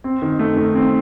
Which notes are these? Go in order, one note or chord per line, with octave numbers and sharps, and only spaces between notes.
C4
D#3
A3
D#3
C4